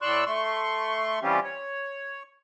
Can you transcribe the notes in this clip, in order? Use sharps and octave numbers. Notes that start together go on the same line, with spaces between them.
A2 D5 C6 C#6 E6 F#6
A3 C6 C#6
E3 G3 C4 C#4 F4 G4
C#5